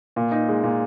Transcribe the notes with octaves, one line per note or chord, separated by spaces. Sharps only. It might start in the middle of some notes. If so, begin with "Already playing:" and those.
A#2
D#4
G#3
A#2